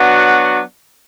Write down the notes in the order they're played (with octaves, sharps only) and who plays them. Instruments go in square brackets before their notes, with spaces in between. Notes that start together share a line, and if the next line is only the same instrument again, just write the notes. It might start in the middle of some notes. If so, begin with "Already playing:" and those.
Already playing: [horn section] F#3 B3 D4 F#4